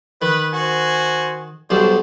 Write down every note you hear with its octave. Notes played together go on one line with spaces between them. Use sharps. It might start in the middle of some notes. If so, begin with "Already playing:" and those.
D#3 B4
F#4 C5 G#5
B1 B2 G3 D4 C5